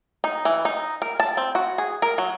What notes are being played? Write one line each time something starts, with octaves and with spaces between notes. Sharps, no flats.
D#4
E3
D#4
A#4
A5
C4
F#4
G#4
A#4
F#3